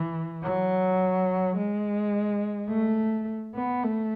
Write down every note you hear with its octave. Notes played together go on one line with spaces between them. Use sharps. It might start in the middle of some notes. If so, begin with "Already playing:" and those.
Already playing: E3
F#3
G#3
A3
B3
A3